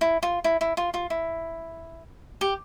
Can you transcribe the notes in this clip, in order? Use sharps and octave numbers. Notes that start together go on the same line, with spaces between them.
E4
F4
E4
E4
F4
F4
E4
G4